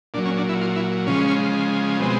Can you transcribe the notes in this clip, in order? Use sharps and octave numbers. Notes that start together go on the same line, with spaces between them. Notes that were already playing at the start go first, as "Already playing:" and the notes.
A#2 F#3 D4
C#4
D4
E4
F4
E4
C#3 F3 G#3 C#4
B2 G#3 C4